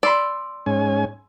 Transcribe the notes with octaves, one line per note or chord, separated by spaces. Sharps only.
D5 B5 C6 E6
G#2 C#4 G#5